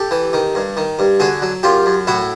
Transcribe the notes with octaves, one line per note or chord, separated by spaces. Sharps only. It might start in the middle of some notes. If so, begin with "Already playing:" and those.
Already playing: G4 A4
E3
D#3
G2
D#3
G2
D3 F#4 G#4
F#3
F#2 F4 G4
F#2
A2 E4 F#4